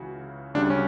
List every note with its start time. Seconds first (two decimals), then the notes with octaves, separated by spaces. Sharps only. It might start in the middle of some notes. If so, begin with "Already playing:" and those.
Already playing: C#2 C#3 E3 F#4
0.54 D2 C#3 G3 D4
0.70 C#4